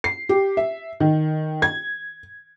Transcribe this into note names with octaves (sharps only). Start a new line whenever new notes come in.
C7
G4
E5
D#3
G#6